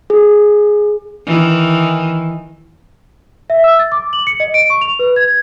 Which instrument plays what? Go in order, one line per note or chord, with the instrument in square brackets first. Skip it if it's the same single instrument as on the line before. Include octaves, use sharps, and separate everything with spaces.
[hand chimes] G#4
[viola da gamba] D#3 E3
[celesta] E5
E6
A6
D6
F#7
C#7
D#5
D7
C#6
F7
B4
G#6